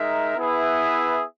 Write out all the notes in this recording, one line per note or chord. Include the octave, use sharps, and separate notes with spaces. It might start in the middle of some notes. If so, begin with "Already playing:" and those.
Already playing: G#3 D#4 A#4 E5
B3 E4 G#4 B4 E5